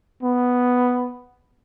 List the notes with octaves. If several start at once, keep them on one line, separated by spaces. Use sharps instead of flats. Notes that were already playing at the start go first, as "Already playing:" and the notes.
B3